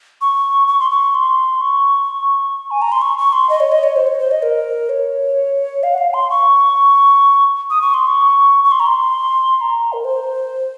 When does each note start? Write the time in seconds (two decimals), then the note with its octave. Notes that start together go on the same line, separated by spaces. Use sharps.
0.21 C#6
0.68 C#6
0.80 C6
0.90 C#6
1.15 C6
1.61 C#6
2.71 G#5
2.82 A#5
2.92 C6
3.02 C#6
3.18 C#6
3.33 C6
3.50 D#5
3.60 C#5
3.72 D#5
3.83 C#5
3.96 C5
4.07 C#5
4.19 C5
4.31 D#5
4.42 A#4
4.89 C#5
5.83 F5
5.94 F#5
5.98 F5
6.14 C6
6.30 C#6
7.70 D#6
7.82 C#6
7.94 C6
8.07 C#6
8.64 C#6
8.72 C6
8.80 A#5
8.86 C6
9.56 C6
9.61 A#5
9.93 A#4
10.04 C5